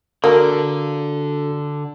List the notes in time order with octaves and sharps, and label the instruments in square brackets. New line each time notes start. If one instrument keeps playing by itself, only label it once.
[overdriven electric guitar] D3 [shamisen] A#3 [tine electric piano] D4 F#4 A4